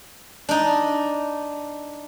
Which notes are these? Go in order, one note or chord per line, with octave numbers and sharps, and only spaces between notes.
D4 D#4